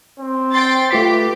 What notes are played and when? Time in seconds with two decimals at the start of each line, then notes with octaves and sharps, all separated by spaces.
0.19 C4
0.53 G5 C6 A6
0.91 A3 F4 G4 B4 B6